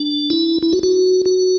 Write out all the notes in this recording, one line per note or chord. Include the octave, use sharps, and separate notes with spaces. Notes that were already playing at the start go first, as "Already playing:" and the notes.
Already playing: D4
E4
E4
F#4
F#4
F#4